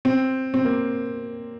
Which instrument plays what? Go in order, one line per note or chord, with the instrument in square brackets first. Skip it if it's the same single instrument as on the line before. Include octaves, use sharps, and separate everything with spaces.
[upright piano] C4
C4
A#3